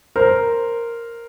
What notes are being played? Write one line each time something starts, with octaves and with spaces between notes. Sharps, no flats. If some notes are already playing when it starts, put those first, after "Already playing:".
A#4 C5